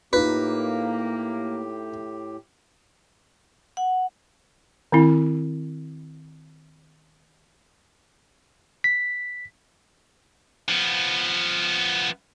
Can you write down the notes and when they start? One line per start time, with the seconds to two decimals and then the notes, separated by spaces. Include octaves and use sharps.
0.13 A2 A#3 D#4 F4 G4 B4
3.77 F#5
4.92 D#3 C4 E4
8.84 B6
10.69 F3 B3